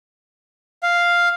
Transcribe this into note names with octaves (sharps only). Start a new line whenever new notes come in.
F5